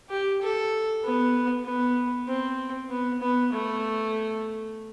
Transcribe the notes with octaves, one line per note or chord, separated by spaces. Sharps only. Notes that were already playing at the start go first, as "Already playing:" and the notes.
G4
A4
B3
B3
C4
B3
B3
A3